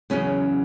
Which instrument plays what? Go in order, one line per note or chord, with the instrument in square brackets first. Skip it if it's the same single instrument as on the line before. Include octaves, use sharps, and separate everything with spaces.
[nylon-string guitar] E2 C#3 F#3 C#4